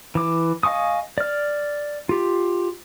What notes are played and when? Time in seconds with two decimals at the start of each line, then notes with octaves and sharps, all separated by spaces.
0.15 E3 D6
0.63 D#5 F5 G#5 C#6 D#6
1.18 D5 F6
2.09 F4 G4